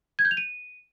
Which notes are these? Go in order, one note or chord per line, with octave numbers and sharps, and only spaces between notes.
G#6
G6
F7
D#7